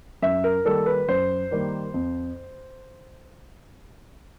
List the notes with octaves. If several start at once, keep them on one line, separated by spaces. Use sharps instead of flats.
F#2 E5
A#4
D#3 G3 A#3 A4
B4
F#2 C5
D#3 G3 A#3
F2